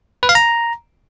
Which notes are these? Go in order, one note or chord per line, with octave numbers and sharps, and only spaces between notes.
B4
F5
A#5